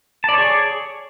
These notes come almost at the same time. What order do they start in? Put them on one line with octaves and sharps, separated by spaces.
A5 D5 C#5 G#4